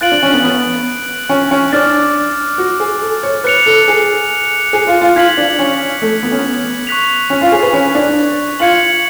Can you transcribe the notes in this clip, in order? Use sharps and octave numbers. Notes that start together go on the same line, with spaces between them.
F4 F#6 A6 D7 F#7
D4
C#4
B3
B3
C#4
C#4
D4 D6 F6 A6
F#4
G#4
A4
C#5
B4 F#6 C#7 F7
A4
G#4
G#4
F4
F4
F4 G#6 B6 F#7
D4
C#4
A3
B3
C#4
B3
C#6 F#6 B6 F7
C#4
F4
G#4
B4
C#4
D4
F4 G#6 C#7 F#7